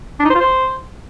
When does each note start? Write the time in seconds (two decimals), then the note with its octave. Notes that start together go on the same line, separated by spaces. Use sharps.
0.20 D4
0.25 D#4
0.30 C5
0.35 F4
0.40 C5